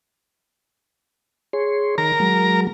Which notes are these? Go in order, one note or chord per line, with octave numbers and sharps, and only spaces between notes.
G#4 C#5 C6
D#3 A#4 A#5
F#3 G#3